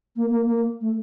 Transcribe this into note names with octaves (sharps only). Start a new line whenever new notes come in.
A#3
A#3
A#3
A3